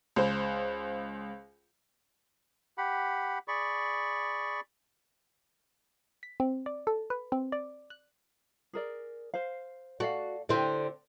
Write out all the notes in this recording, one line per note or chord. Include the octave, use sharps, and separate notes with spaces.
C#2 C5
G4 F#5 B5
G#4 D5 B5 C#6
B6
C4
D5
A4
B4
C4
D5
F#6
G#4 A#4 D5
C5 F5
F#4 A4 D5 F5
D3 C4 E4 G4